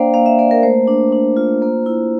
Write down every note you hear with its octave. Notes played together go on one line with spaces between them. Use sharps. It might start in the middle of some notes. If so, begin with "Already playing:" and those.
Already playing: A#3 D4 C5 D5 F5 G5
A#3 F5
E5
A#3 D5
A#4
A3 C5
D4
D4
F4
A#3
E4